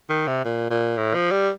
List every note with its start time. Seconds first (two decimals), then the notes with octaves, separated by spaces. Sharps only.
0.10 D#3
0.27 C3
0.45 A#2
0.70 A#2
0.97 A2
1.15 F3
1.31 G3